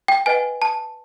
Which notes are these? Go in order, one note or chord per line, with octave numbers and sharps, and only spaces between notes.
G5
B4 D#5 F#5 G#5
A5